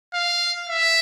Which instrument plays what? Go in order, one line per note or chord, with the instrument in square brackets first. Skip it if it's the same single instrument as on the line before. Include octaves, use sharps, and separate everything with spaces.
[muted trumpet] F5
E5